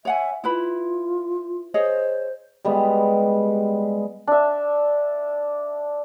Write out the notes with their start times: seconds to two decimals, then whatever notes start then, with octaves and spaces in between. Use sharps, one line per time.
0.05 C#5 E5 F#5 G#5
0.44 E4 F4 B4 B5
1.74 G#4 C5 C#5 D#5
2.65 G3 G#3 B3
4.27 D4 E5